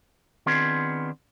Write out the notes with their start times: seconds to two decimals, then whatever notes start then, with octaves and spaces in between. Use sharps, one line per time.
0.46 D#3 B3 C4 D4 F4 G#4